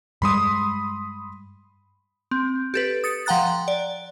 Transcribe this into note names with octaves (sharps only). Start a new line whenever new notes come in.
G2 G3 G#3 B5 C6 D#6
C4
G4 A4 B4
D#6 A6 C#7
F3 F#5 G5 A#5 F#6 A6
D5